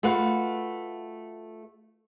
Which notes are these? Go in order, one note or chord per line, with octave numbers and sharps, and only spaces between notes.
A3 F4 F#4 B4